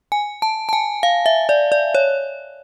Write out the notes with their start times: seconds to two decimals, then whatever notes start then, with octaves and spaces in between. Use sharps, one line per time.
0.12 G#5
0.42 A5
0.69 A5
0.73 G#5
1.03 F5
1.26 E5
1.49 D5
1.72 D5
1.95 C#5